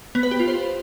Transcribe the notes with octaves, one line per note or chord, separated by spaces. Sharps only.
B3
B4
G4
F4
C5